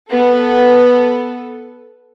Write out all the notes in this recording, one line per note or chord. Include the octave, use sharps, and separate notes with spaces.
B3 A4